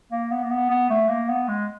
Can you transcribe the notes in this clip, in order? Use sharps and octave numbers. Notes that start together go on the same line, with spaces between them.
A#3
B3
A#3
B3
B3
A3
A#3
B3
G#3